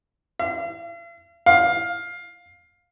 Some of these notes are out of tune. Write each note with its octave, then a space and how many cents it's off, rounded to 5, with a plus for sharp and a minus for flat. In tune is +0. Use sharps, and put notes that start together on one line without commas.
F5 -45
F5 +15